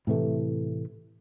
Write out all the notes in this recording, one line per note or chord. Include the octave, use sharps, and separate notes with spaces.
A2 C3 E3 A3